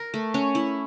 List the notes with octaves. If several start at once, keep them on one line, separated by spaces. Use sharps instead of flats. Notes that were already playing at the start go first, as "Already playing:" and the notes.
Already playing: A#4
A3
C#4
E4